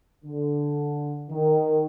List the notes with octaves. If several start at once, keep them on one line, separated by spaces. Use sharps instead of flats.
D3
D#3